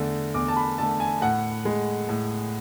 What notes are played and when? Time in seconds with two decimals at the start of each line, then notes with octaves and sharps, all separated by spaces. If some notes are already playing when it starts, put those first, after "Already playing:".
Already playing: E2 D3 A3
0.34 E2 D6
0.48 A5
0.57 B5
0.78 D3 A3 A5
1.00 G#5
1.22 A2 F#5
1.65 G#3
2.09 A2